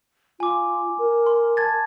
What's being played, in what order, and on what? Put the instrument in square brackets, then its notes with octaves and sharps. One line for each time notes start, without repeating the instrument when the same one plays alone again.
[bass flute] F4 [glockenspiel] G#5 D6
[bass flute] A#4
[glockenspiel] C6
A5 G#6 A6